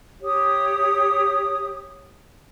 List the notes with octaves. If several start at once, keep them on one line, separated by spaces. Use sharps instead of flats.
G4 C#5 D#6